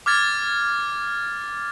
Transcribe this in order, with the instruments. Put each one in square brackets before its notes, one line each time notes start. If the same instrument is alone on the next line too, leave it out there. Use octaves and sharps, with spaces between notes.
[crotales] D6 F6 G#6 A6